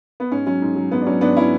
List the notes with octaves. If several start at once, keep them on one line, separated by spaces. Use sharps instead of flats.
B3
G#2 C#4
F#3 C#4
G#2
F#3
G#2 B3
D4
F#3 C#4
G#2 B3 D4
F#3 C#4 E4